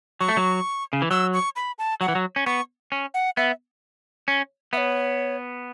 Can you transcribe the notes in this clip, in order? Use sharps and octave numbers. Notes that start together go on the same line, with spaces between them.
F#3 C#6
A3
F#3
C#3
E3
F#3 E6
C#6
B5
A5
F#3 F#5
E3
F#3
C#4
B3 C#6
C#4
F#5
B3 E5
C#4
B3 C#5 E5